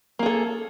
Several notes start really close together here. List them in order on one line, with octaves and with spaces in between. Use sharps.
A#3 G#4 A4